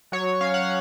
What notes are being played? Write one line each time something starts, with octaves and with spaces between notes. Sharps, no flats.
F#3 C#5
C#4 F5
F#5